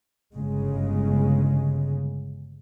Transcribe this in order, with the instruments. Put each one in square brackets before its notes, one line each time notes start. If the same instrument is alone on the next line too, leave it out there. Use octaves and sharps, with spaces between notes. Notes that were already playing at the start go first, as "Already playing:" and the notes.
[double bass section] G1 C#3 G#3